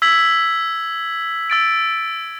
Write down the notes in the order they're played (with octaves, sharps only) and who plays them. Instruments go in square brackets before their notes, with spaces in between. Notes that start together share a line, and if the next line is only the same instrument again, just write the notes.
[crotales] E6 G#6 B6 F#7
E6 A6 D7